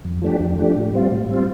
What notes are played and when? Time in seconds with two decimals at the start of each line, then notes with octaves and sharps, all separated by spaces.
0.05 F2
0.22 F3 A3 D4 G4
0.40 F2
0.58 F3 A3 D4 G4
0.76 A2
0.93 G3 C4 F4
1.12 A2
1.29 G3 C4 F4